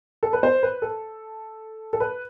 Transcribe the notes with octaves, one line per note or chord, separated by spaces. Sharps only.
A4
B4
C5
B4
A4
A4
B4